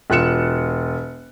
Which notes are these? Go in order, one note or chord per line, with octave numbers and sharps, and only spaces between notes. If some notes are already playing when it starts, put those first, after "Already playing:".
E1 F4 F#6 C#7 E7